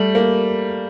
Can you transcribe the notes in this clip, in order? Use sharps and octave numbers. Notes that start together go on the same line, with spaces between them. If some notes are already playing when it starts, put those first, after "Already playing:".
Already playing: G3 A3
A#3